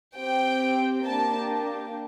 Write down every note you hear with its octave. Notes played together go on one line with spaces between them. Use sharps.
C4 G4 G5
A#3 D4 G4 A5